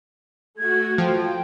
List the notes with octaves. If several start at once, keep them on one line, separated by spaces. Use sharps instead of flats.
A3 F#4 G#6
F3 G5